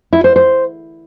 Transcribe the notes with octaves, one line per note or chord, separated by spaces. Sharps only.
E4
C5
C5